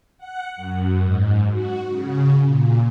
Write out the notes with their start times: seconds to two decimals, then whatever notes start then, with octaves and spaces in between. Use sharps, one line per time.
0.18 F#5
0.56 F#2
1.03 G#2
1.52 F#4
1.89 C#3
2.46 A#2